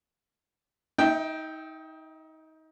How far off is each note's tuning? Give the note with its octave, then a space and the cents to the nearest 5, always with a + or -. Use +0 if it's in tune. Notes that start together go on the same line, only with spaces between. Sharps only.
D#4 +25 E5 -15 G5 +0